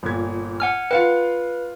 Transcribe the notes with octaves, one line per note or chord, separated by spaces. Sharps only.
G1 A#2 G#6
F#5 G#5 F6
F4 B4 F5 G5